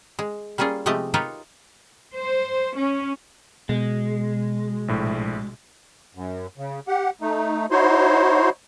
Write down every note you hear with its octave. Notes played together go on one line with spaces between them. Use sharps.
G#3
G3 A#3 C#4 F4 G#4
C3 F3 G#3 A3 G4 D#5
D#4 F4 G4 A#4 B4 C#5
C5
C#4
B2 G#3
A#1 A2
F#2
C#3
G4 F#5
A3 D#4
D#4 E4 F#4 C5 C#5 C6